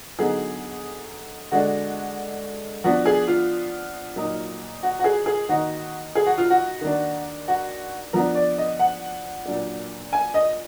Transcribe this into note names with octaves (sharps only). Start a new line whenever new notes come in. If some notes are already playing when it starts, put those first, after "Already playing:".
D3 F#3 B3 D#4 G#4
D3 G#3 D4 F#4
F3 B3 D4 F#4
G#4
F4
A#2 F#3 A#3 D#4
F#4
F#4
G#4
G#4
D#3 A#3 D#4 F#4
G#4
F#4
F4
F#4
D#3 A#3 D4
F#4
F3 B3 D4 A#4
D5
D#5
F#5
A#2 F#3 D4
G#5
D#5